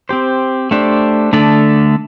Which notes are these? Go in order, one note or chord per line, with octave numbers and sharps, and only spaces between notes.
C4 G4 C5
A3 D4 G4 C5
D3 A3 D4 A4